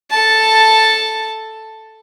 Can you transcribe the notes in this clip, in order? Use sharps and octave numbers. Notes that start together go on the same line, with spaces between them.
A4 A5